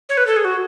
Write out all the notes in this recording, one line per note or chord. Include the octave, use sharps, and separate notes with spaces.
C#5
B4
A4
G#4
F#4